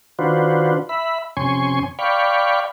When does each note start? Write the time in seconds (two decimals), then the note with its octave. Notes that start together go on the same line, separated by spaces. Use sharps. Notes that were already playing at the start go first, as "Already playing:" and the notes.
0.19 D#3 D4 F4 F#4 B4 C5
0.89 E5 B5
1.37 F2 C3 C#4 G#5 C6 C#6
1.99 D5 F5 G5 B5 C#6